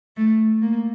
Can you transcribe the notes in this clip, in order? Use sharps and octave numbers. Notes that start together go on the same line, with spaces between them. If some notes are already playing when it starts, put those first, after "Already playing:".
A3
A#3